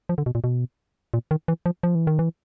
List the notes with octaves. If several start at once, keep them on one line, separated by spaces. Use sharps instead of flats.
F3
D3
B2
A#2
B2
A#2
D#3
E3
F3
F3
E3
D#3
E3